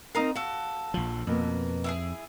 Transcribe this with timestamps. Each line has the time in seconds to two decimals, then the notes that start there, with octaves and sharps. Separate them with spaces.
0.15 C4 D#4 A#4 F5 A#5 D#6
0.35 F#4 A4 F5
0.94 A#1 F3
1.27 F2 B2 A#3 B3
1.84 E4 F4 G#4